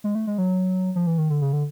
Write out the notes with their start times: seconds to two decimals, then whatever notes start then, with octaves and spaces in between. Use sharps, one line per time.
0.04 G#3
0.15 A3
0.27 G#3
0.38 F#3
0.96 F3
1.07 E3
1.18 D#3
1.30 D3
1.41 C#3
1.53 D3